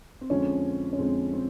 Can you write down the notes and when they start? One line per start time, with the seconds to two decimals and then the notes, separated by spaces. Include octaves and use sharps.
0.21 C4
0.30 F2 D3 F3 G#3 C#4
0.93 C#4
0.99 F2 D3 F3 G#3 C4
1.33 C4